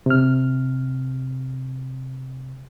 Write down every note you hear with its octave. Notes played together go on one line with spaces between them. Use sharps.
C3 F6